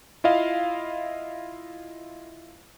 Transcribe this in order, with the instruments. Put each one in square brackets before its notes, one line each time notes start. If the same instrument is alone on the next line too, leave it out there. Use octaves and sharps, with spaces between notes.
[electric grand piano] E4 F4 D#5 F5